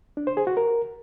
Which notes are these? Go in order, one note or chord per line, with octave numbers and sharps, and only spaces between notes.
D4
C5
G#4
F#4
A#4